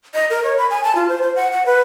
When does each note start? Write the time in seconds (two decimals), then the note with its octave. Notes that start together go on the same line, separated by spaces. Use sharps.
0.14 D#5
0.30 A#4
0.44 C#5
0.58 B5
0.70 G#5
0.84 A5
0.95 F4
1.09 C5
1.22 C5
1.36 F#5
1.52 F#5
1.66 B4